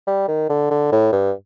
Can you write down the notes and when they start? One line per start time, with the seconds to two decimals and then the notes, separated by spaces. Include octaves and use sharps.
0.07 G3
0.28 D#3
0.49 D3
0.70 D3
0.92 A2
1.12 G2